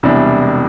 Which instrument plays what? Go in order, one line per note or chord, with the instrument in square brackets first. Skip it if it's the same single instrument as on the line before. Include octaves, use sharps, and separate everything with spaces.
[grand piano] E1 E2 C3 G3 D4